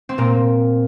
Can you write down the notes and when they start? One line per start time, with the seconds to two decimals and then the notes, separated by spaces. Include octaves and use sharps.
0.09 C4
0.18 A#2 A#3